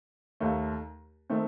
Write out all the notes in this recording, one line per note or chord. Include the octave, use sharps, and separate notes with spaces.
D#2 D#3 A3
D#3 A3 C4